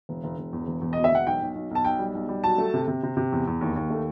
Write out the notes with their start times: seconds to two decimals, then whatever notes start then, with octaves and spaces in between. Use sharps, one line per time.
0.09 E1
0.24 E1
0.38 E1
0.53 E2
0.67 E1
0.81 E2
0.93 B2 D#5
1.04 E5
1.11 E1 F#5
1.26 B1 G5
1.41 B1
1.55 B1
1.71 B1 A5
1.85 B1 G5
1.99 G3
2.15 B1
2.28 G3
2.44 F#3 A5
2.58 A3
2.74 C3
2.88 C3
3.03 C3
3.17 C3
3.32 E2
3.47 E2
3.61 D#2
3.76 D#2
3.90 A3